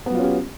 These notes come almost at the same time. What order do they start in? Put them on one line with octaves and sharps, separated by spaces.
B3 F#3 F4 C#4 G4